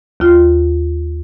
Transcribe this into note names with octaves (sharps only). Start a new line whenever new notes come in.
D#2 F4